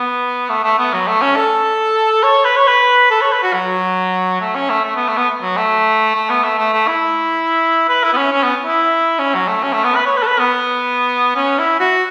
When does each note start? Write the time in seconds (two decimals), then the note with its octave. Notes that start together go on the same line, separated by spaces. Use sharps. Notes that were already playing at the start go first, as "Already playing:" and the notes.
Already playing: B3
0.49 A3
0.64 A3
0.79 B3
0.93 F#3
1.07 A3
1.22 C#4
1.36 A4
2.23 C#5
2.45 B4
2.56 C#5
2.67 B4
3.10 A4
3.21 C#5
3.32 B4
3.43 F#4
3.53 F#3
4.41 A3
4.55 C#4
4.70 A3
4.84 A3
4.95 B3
5.08 A3
5.17 B3
5.42 F#3
5.57 A3
6.15 A3
6.29 B3
6.43 A3
6.58 A3
6.73 A3
6.87 E4
7.88 B4
8.04 E4
8.13 B3
8.17 C#4
8.32 C#4
8.43 B3
8.65 E4
9.19 C#4
9.34 F#3
9.48 A3
9.63 C#4
9.73 A3
9.84 B3
9.95 B4
10.06 C#5
10.17 B4
10.23 A4
10.27 B4
10.39 B3
11.36 C#4
11.59 E4
11.80 F#4